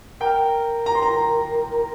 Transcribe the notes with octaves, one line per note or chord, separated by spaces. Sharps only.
A#4 G5
A#5
C6
A#5